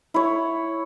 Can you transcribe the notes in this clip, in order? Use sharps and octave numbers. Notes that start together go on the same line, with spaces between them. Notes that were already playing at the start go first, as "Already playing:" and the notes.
E4 C#5